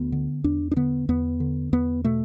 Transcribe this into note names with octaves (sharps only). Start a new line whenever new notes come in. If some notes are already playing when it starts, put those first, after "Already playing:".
Already playing: D2 B3
D3
E2 D4
D4
D3 B3
E2 B3
D3
E2 B3
B2 A3